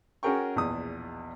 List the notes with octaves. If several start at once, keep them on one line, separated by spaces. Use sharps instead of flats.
C#4 F#4 G#4 A#4 G5 C#6
A#1 E2 B2 D#6